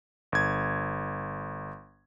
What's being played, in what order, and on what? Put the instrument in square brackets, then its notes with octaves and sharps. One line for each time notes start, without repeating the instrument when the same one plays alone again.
[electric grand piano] G1 G#6